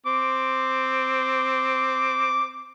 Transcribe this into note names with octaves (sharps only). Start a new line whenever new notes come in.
C4 D6